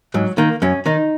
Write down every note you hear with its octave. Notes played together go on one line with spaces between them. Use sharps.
G#2 F#3
D#3 A#3
F#2 C#4
D#3 D#4